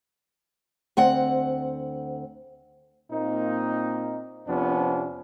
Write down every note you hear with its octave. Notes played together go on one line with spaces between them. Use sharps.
D2 C4 F#5
A#2 A#3 C4 D#4
F2 C3 F3 B3 C#4 D4